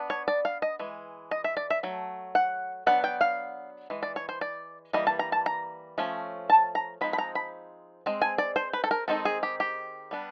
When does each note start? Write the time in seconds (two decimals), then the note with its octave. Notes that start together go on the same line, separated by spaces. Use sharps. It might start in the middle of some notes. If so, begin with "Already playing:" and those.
Already playing: B3 D4
0.10 C#5
0.28 D5
0.45 F5
0.62 D#5
0.79 E3 G#3
1.31 D#5
1.44 E5
1.57 D5
1.70 E5
1.83 F#3 A3
2.35 F#5
2.86 F#3 B3 D4 F#5
3.04 G5
3.21 F5
3.90 E3 G#3
4.03 D5
4.16 C#5
4.29 C5
4.41 D5
4.93 E3 G3 A#3 D#5
5.07 A5
5.19 A#5
5.32 A5
5.46 A#5
5.98 F3 A3 C#4
6.50 A5
6.75 A#5
7.01 F3 G#3 C4 D#4 B5
7.13 B5
7.18 A#5
7.35 B5
8.06 G#3 C4
8.22 G#5
8.38 D5
8.56 C5
8.73 B4
8.84 A4
8.91 A#4
9.08 D#3 G#3 C4 D#4 A4
9.25 G#4
9.43 G4
9.60 G4
10.11 G3 B3 D4